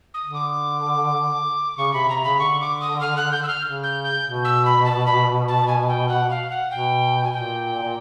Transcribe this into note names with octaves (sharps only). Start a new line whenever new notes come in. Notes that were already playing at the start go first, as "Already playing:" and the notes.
D#6
D3
D6
C#3 C#6
C3 B5
C3 A#5
C#3 B5
D3 C#6
D6
D#6
F6
F#6
G6
E6
F6
C#3
G6
G6
B2
E6
B5
A5
B5
A5
G#5
G5
F#5
F5
F#5
B2 G5
G#5
A#2 G5
A#2